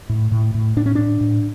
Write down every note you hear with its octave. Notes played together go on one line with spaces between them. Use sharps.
A2
A2
A2
A2 D4
C#4
A2 D4
A2